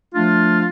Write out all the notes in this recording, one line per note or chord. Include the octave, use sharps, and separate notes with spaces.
F3 A3 D4 F4